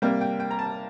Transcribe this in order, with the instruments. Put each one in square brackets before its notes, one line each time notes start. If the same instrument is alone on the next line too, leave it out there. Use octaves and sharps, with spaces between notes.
[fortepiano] C3 G3 A#3 G5
G5
G5
A#5
A5